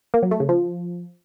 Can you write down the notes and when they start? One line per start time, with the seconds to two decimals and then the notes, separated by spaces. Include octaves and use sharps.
0.14 A#3
0.23 F#3
0.31 A3
0.40 C#3
0.49 F3